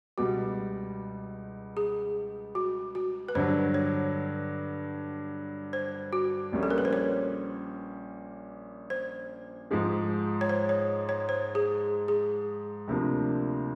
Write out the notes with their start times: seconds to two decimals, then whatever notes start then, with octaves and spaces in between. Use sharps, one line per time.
0.18 C#2 B2 G3 F#4
1.77 G#4
2.55 F#4
2.95 F#4
3.29 B4
3.35 G2 D3 F#3 C5
3.74 C#5
5.73 C5
6.13 F#4
6.52 A#1 A#2 G3 A#3 C#4
6.63 A4
6.70 A#4
6.78 B4
6.85 C5
6.93 C#5
8.90 C5
9.71 G#2 F3 G#3
10.41 C#5
10.49 C5
10.69 C#5
11.09 C#5
11.29 C5
11.55 G#4
12.08 G#4
12.87 D2 C3 F3 A#3 D4